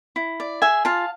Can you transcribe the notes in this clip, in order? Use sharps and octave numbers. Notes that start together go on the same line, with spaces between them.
E4
D5
G#4 E5 G#5
F4 F5 A5